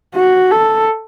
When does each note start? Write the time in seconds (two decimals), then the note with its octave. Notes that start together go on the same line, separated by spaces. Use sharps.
0.15 F#4
0.51 A4